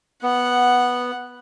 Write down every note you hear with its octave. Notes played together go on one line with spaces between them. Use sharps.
B3 F#5